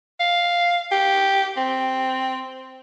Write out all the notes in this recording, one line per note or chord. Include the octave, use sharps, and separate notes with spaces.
F5
G4
C4